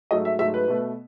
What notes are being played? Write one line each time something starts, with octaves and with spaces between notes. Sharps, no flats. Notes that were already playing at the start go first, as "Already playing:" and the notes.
G#2 F#3 A3 D#5
E5
G#2 F#3 A3 E5
B4
B2 A3